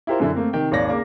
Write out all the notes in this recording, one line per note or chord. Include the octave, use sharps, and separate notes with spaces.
E4 F4 G4 A#4 C5
F#2 D3 E4
A3 A#3 C4
C3 D#3 G5
G#1 D#2 C#5 D5 A#6
C#3 A#3 D6